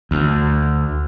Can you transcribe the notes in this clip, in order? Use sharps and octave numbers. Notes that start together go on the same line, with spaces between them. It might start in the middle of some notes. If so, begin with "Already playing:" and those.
D2